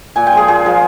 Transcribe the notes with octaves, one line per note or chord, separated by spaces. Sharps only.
A#2 G#5
G5
F3 G#3 G#4
A#2 G#4
F3 G#3